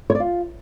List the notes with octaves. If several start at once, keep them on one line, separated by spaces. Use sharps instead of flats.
C#5
D5
F4